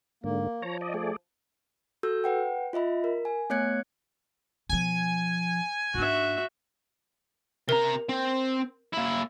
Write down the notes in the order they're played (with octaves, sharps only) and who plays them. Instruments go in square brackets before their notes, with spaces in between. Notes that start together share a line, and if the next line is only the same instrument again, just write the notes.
[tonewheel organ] G#2 D3 [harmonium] A#3
[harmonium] F3 [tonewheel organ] C#5 A#5
[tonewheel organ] D5 D#5
A3 G#4 D5
[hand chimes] F#4 A4 E6 G6
B4 F#5 G5
F4 D#5 E5 B5
A#4
G#5
A3 B3 C#5 F#6 G#6 C#7
[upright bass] B2 F3 [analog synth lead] G#5
[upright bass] G#2 D4 [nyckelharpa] F#4 E5
[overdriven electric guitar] C3 A#5 [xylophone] A#4
[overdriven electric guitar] C4
A#3 E4